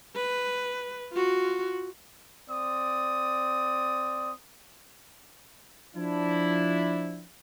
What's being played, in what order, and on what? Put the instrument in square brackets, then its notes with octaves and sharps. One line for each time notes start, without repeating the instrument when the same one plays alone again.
[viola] B4
F4 F#4
[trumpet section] C4 D5 D#6
[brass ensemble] F3 D4 E4